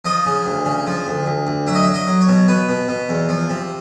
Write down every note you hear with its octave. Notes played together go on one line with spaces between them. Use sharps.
F3 D#5
C#3
D2
C#3
F3
D2
D2
D2
F#3 E5
D#5
F#3 E5
D#5
F#3
C#5
B2
B2 B4
B2
B2
E2
F3
C3